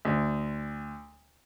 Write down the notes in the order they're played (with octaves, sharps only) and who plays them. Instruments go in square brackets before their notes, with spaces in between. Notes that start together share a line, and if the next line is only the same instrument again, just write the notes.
[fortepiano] D2